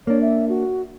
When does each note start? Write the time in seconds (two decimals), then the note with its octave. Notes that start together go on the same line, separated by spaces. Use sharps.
0.07 A#3 D4 C#5
0.21 E5
0.49 F#4